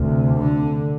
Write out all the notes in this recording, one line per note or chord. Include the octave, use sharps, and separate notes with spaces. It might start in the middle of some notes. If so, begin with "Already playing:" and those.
Already playing: D2 C3
D3